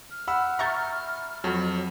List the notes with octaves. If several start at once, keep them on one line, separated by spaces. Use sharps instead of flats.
F6
F#5 B5 E6
E5 A#5 C#6 G6 A6
F2 F#3 F#4